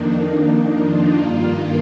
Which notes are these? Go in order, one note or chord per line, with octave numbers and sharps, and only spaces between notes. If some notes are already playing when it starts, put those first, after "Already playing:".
Already playing: F2 D#3 A#3 D4 D#4
D#4
F4
G2 D#3 A#3